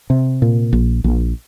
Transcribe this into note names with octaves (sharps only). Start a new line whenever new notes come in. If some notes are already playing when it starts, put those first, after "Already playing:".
C3
A#2
A#1
A#1